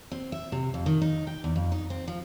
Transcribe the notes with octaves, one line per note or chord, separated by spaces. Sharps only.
C4
E5
C3
F2
D#3
D#4
G5
E2
F2
D#4
C4
F3